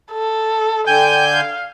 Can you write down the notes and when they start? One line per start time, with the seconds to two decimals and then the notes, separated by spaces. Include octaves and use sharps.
0.12 A4
0.87 D3 G5 G#5 G6
1.33 F5